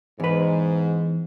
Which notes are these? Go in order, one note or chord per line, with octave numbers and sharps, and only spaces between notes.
E2 G#2 B4